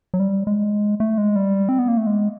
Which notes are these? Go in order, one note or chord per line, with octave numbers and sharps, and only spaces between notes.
F#3
G3
G#3
A3
G#3
G3
C4
B3
A#3
A3
G#3